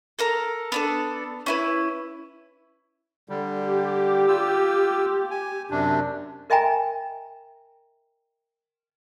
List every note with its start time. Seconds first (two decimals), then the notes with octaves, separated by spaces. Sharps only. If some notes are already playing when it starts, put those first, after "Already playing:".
0.19 A4 A#4 A#5
0.72 B3 D4 A4
1.46 C#4 E4 B4
3.29 D3 G3
3.59 G4
4.28 F4 E6
5.31 G#5
5.70 F#2 C3 D4
6.50 A#4 D#5 E5 G5 G#5 A#5